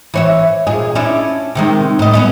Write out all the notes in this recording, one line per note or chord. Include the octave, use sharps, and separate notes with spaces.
E3 C#5 E5
A#2 G#4 D#5
C#4 D4 E4
C3 D#3 G#3
A2 D#5
B3 C#4 D#5